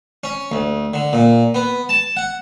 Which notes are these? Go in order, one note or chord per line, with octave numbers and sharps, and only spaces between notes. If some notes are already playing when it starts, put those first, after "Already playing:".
C#4
D2
D3
A#2
B3
A5
F#5